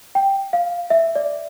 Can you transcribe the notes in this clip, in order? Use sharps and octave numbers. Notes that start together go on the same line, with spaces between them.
G5
F5
E5
D5